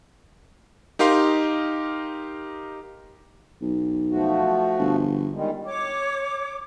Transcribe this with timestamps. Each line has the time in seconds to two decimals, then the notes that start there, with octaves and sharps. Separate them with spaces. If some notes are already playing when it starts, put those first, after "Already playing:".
0.99 D#4 G4 A#4 F5 C6
3.62 B1
4.10 F3 A3 F#4
4.79 G1
5.34 D#3 G3 G#3
5.65 C#5 D6